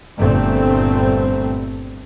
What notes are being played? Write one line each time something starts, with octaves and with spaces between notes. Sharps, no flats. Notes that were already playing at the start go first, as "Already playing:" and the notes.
G1 G2 A#2 A3 C4